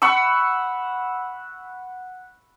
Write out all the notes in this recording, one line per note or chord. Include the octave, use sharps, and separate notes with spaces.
F#5 B5 C#6 E6